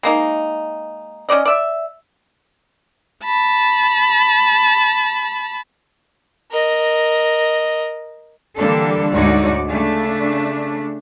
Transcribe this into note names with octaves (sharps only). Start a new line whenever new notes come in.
G#3 A#3 D#4
C#4 D#4 D5 D#5
D5 E5
A5 B5
A#4 D#5
D3 E3 G3 A#3 D4 A4
D2 G#2 D#4 F#4 C#5 D5
C#3 A3 D4